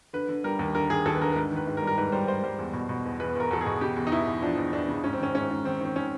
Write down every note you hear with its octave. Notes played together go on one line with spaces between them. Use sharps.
D3 B4
D3
G3 A#4
D#2
D3 A#4
D#2 G#4
D#2 A4
B4
D3 A#4
A#4
G#2 B4
D#3
B4
G#2
A#4
G3
A#4
G#2 B4
G3 C5
G#2 C5
G3 C5
E2
B2
B2
E2
E2 B4
E2 A#4
E2 A4
G#4
B2
C#3 G4
E2
D#4
E2 E4
E2
F3 D4
E2
E2 D4
C#3
G#2 C#4
C4
D#3 C#4
G#2 C#4
G#2
D#3 C4
D#3 C4
D#3 C#4